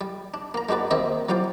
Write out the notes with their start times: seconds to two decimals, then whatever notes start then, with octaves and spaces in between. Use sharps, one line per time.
0.01 G3
0.34 D4
0.54 A#3 A#5
0.69 G#3 D4 F#4 B4 D5
0.91 D#2 D#3 C4 D#5 E5
1.29 F#3 G3 F4 C5 D5